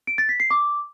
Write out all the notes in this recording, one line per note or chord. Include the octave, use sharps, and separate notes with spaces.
D7
A6
B6
C7
D6